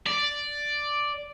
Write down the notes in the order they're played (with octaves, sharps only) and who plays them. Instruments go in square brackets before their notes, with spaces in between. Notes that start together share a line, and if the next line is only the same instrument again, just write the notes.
[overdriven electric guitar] D5